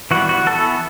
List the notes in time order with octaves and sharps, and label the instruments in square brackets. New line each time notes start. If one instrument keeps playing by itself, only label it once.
[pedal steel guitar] E3 G3 B3 F#4
F#4
E3 B3 A4